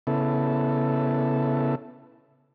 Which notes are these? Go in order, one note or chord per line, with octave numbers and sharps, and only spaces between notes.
C#3 B3 E4 A4